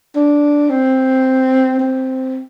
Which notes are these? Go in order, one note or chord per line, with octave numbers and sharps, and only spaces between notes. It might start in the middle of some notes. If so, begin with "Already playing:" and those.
D4
C4
C4